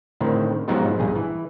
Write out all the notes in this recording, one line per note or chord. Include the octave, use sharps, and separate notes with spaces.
A2 D3 D#3 C4
G#2 F3 F#3 B3 D#4 G4
A#1 G2 G#4
E3